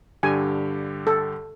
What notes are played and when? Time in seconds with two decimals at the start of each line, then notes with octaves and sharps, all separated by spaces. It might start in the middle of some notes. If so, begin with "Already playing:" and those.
0.23 G2 D3 G4 G#5
1.07 A4